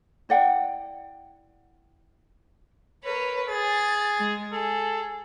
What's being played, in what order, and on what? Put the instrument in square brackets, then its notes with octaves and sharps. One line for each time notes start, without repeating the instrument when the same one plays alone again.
[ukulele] E4 D5 F#5 G5
[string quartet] A#4 B4 C#5
[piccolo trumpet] G#4 [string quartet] A6
[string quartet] G#3
[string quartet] G#4 [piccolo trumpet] A4